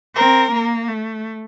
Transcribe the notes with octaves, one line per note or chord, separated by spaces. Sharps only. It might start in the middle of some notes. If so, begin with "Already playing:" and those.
C4 A#4
A#3
A3